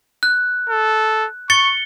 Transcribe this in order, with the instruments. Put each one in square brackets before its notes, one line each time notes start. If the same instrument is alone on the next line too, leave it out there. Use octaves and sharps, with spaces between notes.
[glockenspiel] F#6
[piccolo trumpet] A4
[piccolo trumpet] C#6 [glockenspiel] A6 C#7 G7